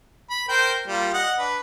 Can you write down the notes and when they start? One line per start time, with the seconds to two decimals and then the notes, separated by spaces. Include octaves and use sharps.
0.30 B5
0.48 A#4 C5 G5
0.87 G3 A#3 F4
1.13 D#5 F#5
1.39 D4 B4